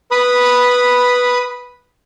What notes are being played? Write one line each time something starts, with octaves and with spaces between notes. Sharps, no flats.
B4 B5 D#6